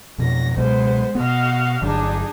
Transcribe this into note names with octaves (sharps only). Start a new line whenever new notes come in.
F2 B2 F#3 A#6
C#2 B2 F#3 G#3 B3 C5
B2 B3 F#4 D#5 F5
G1 D3 F#3 D4 D#4 G#4